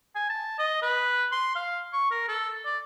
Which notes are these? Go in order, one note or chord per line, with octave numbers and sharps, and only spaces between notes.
G#5
A5
D#5
B4
C6
F5
C#6
A#4
A4
D5